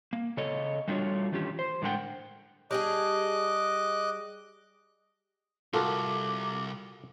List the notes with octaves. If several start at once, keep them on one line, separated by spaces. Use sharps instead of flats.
A#3
C#3 A4 C#5 D#5
G3 A3 D4 F4 F#4 C#5
D#3 E3 A3 C#4 F4 G4
C5
A2 D3 G#3 A#4 F#5 G5
G3 D4 G#4 D#5 D6 F#6
C2 F4 F#4 A4 A#4 D6